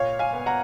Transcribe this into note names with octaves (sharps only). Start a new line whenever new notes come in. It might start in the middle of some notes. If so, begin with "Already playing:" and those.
Already playing: A#2 C#5 F5
F5 G#5
B3
F#5 A#5